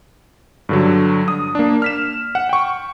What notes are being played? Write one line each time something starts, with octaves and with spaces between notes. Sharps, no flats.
G2 D3 F#3
D#6
A#3 D4
F6 B6 E7
F#5
G5 C#6